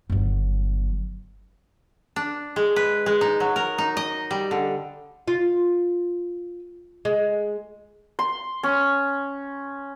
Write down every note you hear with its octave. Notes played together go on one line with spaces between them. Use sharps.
G1 F#3
D4
G#3
B4
G#3
D#4
F#3
A#4
D#4
D#5
G3
D3
F4
G#3
C6
C#4